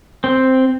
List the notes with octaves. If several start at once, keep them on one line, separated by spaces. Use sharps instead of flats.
C4